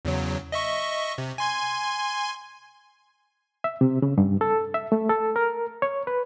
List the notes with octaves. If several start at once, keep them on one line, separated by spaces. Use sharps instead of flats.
E2 C#3 F#3
D#5 E5 C#6
C3
G#5 C6 G#6
E5
C3
C#3
G2
A4
E5
A3
A4
A#4
C#5
B4